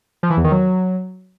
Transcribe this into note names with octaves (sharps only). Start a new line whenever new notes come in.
F3
E3
E2
D#3
F#3